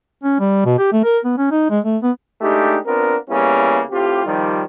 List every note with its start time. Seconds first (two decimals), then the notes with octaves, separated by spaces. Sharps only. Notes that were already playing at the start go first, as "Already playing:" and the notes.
0.23 C#4
0.40 G3
0.65 B2
0.78 G4
0.92 A3
1.04 A#4
1.25 B3
1.38 C#4
1.51 D#4
1.70 G#3
1.84 A3
2.03 B3
2.42 G#3 A3 D4 D#4 G4
2.86 B3 C4 D4 F4 A#4
3.30 C#3 G3 A#3 B3 C#4 E4
3.91 A2 C4 F4 G4
4.25 D#3 F3 G3